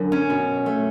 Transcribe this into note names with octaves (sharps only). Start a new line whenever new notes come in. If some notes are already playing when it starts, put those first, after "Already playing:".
Already playing: F#2 D3
C#4
B2
A3